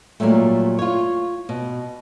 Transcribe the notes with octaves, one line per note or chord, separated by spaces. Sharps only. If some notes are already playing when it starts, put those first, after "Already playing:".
A#2 D3 F#3 G3 A3
F4 C#5
B2